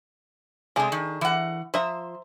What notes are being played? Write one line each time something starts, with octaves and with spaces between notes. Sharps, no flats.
C3 G#3 D4 G#4 A4
D#3
E3 F#5
F3 C5 E5 A#5